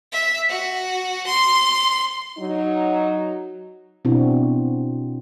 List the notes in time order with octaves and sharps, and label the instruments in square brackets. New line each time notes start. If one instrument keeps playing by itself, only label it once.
[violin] E5
F#4
C6
[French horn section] F#3 D#4
[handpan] B2 C4 D4 E4 F#4